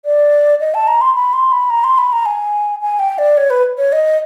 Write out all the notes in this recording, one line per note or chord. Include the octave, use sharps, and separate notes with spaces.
D5
D#5
A5
A#5
C6
B5
C6
B5
A#5
C6
B5
A#5
G#5
G#5
G5
D5
C#5
B4
C#5
D#5